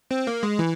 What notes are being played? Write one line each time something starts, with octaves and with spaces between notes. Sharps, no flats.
C4
A#3
G#3
E3